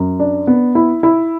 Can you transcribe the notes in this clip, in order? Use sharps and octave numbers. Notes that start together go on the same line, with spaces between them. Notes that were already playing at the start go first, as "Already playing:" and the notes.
Already playing: F#2
D4
B3
E4
E4